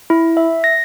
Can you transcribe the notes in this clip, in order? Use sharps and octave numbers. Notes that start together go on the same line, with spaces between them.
E4
E5
A#6